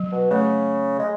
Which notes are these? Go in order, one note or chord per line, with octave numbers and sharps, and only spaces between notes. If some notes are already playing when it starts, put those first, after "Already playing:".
Already playing: F#3
B2
C#3 A3
G#3